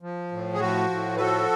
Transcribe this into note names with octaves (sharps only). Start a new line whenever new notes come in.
F3
A2
G#4
F3 F#4
A2
B4
F3 F#4 A4